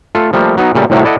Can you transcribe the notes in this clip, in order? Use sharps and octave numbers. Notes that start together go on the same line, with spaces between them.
A3 F4 A4
F3 G3 A3 A#3
F#3 B3 D#4
A#2 C#3 G3 A3
C2 A2 C3 D#3 F#3 A3
E4 A4 D5 D#5 F#5